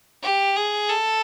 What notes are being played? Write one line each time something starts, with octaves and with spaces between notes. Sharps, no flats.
G4
G#4
A4